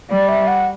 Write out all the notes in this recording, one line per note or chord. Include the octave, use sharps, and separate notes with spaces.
G3 D5
E5
F#5